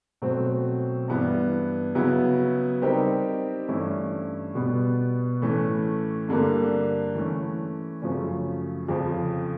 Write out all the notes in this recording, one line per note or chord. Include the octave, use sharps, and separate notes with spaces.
B2 F#3 A3 C4
G2 E3 G3 B3 E4
C#3 F#3 B3 E4
G3 C4 D#4 G4 A#4
G2 E3 A3 C#4 E4
B2 G3 B3
A2 E3 A3 C#4
G2 D3 G3 A#3
E3 A3 C#4
F#2 C#3 F3 A3 C#4
F2 C#3 F3